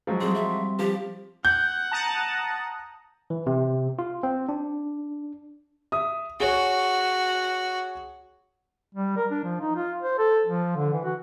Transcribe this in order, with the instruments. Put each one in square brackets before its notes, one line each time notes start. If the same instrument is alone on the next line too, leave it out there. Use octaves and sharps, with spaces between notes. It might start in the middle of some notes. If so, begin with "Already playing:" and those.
[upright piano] F3 F#3 G#3
[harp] G3 C4 [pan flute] G#4
[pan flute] E5
[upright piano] F3 [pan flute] G4
[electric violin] F#5 [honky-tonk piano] G6
[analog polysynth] A5 A#5 D#6
[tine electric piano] E3
C3
F4
C4
D4
[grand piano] E5 D#6
[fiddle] F#4 [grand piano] G#4 C#5
[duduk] G3
A#4
D4
F3
D#4
F4
C5
A4
F3
D3
E3
F#4